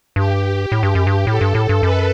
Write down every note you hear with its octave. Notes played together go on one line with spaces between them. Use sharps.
G2 G4
A2 G4
G2
F#2
G2
A2 A4
G2
A2
G2
F#2 B4